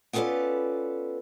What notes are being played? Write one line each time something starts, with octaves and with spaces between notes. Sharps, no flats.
B3 C#4 F4 A4 B4 D5